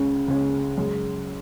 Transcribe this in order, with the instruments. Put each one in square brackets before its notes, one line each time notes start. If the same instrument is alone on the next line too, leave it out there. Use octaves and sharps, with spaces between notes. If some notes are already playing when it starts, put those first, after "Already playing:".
Already playing: [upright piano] C#2 C#3 G#3 C#4
C#2 C#3 G#3 C#4
F#2 C#3 G#3